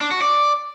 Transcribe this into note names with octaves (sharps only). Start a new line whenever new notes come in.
D4
F#4
D5